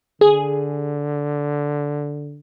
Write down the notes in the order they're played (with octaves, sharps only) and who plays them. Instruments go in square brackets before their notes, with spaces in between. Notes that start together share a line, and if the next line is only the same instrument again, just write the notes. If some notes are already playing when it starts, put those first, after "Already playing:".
[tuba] D3 [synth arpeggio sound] G#4